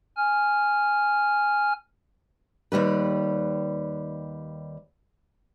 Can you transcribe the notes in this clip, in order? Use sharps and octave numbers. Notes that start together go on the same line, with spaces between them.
G#5 F6
D#2 B2 G3 B4